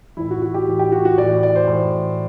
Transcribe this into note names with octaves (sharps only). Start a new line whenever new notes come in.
A2 E3 E4
F#4
F#4
G4
A2 E3
G4
F#4
F#4
A2 E3 D5
D5
C5
A2 E3